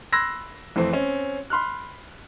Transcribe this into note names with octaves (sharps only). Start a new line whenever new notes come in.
B5 C6 E6 F#6 G#6 A#6
F2 E3 A3 C4
C4 C#4
B5 C6 F6 F#6